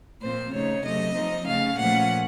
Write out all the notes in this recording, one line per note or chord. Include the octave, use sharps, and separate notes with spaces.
A#2 F3 C4 C5
C#3 A3 D#4 C#5
C3 F#3 A3 D#5
F3 C4 D#4
C#3 A3 C#4 F5
A#2 F3 A3 C#4 F#5